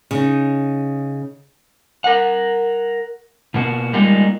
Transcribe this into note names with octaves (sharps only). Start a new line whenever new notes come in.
C#3 D#4
A#4 F#5
B2 A#3 F#4
G3 G#3 A#3 D#4 F4